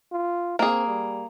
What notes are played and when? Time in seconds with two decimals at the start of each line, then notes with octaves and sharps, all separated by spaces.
0.12 F4
0.59 A#3 C4 G#4
0.87 G3